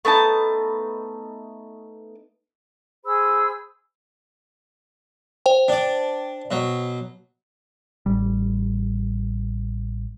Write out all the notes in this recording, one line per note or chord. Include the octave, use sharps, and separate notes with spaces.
A3 B3 D#4 A5
G#4 C5 B5 E6
C5 G5
D4 D5
B2 F#3
A1 G3